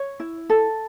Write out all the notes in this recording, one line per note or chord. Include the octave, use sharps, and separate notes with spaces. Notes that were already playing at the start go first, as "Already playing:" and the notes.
Already playing: C#5
E4
A4